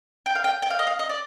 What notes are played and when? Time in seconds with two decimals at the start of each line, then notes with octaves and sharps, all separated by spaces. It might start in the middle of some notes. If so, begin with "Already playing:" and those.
0.26 G5
0.35 F5
0.44 G5
0.62 G5
0.70 F5
0.79 D#5
0.87 F5
0.99 D#5
1.09 D5